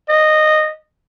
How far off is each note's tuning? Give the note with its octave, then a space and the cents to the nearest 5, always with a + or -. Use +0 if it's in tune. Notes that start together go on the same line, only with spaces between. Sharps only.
D#5 -10